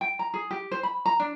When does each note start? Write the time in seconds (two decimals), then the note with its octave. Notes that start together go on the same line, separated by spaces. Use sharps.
0.01 G5
0.19 A#5
0.34 G#4
0.51 G4
0.71 C5
0.83 B5
1.06 A#5
1.20 D4